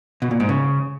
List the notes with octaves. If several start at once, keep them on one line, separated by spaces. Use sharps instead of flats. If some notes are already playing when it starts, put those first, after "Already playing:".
B2
A#2
G#2
C#3